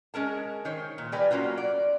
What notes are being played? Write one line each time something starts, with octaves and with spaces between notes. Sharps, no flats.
G#3 C#4 A#4 A5
D#3 C5 C#5
A#2
G3 G4 A#4 B4 D5 G#5
F#3 A#3 C#4 F4 F#4
D5